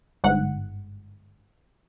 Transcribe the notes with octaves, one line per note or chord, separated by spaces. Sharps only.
G1 G#2 F#5